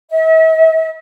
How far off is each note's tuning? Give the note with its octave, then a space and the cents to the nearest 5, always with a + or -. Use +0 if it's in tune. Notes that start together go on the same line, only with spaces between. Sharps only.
E5 -45